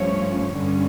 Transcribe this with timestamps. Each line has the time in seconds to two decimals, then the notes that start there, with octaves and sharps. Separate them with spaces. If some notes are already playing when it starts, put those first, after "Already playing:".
Already playing: G2 F3 A3 C#4 C#5
0.52 G2 D3 G3 C#4